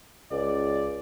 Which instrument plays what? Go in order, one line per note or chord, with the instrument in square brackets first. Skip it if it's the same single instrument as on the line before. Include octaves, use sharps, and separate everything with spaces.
[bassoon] C#2 [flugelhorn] D5